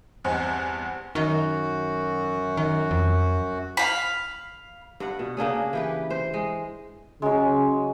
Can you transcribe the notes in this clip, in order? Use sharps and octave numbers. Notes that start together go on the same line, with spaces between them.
E2 G2 C4 C5 F#5 G#5
F#2 D#3 F#4
D#3
F2
F5 B5
G2 B4 F#5
B2
C#3 A#3 D4 G#4
E3 G4 B4
C5
G#3
C#3 F#3 G#3